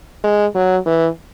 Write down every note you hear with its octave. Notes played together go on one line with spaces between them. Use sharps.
G#3
F#3
E3